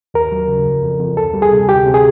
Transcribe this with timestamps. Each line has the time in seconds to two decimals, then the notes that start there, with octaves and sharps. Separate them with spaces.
0.14 D#2 A#4
0.32 F#3
0.48 C#3
0.65 F2
0.83 F2
1.00 F2
1.17 D2 A4
1.34 G3
1.42 G#4
1.52 C3
1.69 D2 G4
1.86 C3
1.94 G#4